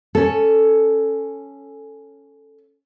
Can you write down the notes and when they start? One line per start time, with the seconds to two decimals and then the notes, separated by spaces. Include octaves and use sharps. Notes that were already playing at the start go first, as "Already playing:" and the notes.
0.15 C#4 A4